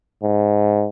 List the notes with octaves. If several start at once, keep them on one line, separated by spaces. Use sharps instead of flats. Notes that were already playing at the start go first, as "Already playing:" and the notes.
G#2